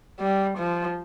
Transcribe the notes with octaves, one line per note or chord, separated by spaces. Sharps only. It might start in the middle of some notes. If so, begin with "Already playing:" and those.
G3
F3